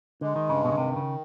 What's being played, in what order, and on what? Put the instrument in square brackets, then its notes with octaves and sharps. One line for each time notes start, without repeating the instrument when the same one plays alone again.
[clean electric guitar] D3 [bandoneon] G#3
[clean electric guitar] D#3
[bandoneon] G2 [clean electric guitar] C#3
[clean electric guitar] B2
C#3
[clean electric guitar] C3 [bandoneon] D#3
[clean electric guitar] C#3